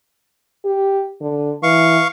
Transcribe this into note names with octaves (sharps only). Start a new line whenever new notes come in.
G4
D3
E3 F5 C#6